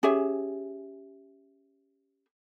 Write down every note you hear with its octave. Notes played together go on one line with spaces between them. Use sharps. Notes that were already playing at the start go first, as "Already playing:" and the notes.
C#4 G4 G#4 E5